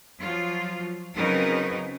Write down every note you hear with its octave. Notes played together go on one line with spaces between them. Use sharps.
F3 F#3 F4
C#3 F#3 C4 D#4 A#4 B4